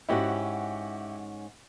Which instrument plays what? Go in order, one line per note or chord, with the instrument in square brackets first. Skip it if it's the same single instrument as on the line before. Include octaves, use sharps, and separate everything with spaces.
[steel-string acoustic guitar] G#2 C#4 F#5 [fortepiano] E4 F#4 G4